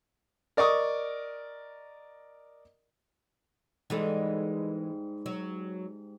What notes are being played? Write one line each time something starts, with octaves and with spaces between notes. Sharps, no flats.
A#4 D5 D#5 C#6 D#6
G#2 E3 G3 G#3 A4
F#3